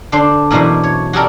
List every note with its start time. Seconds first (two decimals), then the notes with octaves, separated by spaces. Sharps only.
0.12 D3 D4 C5 C6
0.50 F#2 B2 E3 D4 E4 C5
0.83 C#5
1.13 F#4 G4 A4 A#4 D5